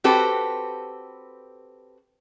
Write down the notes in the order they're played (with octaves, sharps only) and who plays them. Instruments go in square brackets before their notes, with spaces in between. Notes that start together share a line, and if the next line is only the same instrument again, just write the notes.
[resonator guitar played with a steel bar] C4 F#4 G4 A4 B4